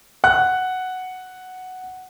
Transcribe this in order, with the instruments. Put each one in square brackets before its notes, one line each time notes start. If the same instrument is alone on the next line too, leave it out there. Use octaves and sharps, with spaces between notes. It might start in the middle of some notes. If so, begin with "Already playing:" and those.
[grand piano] F#5 F#6